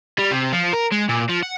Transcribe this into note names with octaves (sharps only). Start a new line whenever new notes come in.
G3
C3
F3
A#4
G#3
A#2
F3
F#5